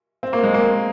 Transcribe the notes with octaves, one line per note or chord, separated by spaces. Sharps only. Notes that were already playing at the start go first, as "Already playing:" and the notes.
C4
A#3
G#3
A#3